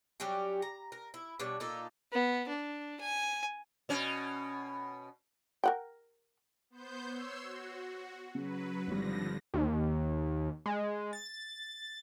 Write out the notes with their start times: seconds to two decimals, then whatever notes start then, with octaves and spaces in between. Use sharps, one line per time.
0.20 F#3 G3 C#4 G4
0.62 A#5
0.92 A#4
1.14 E4
1.40 B2 G3 D4 C#5
1.60 A#2 D#4 F4 A4
2.13 B3
2.49 D4
3.00 G#5
3.89 B2 C#4
5.64 A#4 F#5 G5
6.70 B3 C5 G6
7.07 C#5 C6 E6
7.42 F#4
8.35 C#3 F#3 B4
8.87 G#1 D3 F3 G3 A#6
9.54 D#2
10.66 G#3
11.13 A6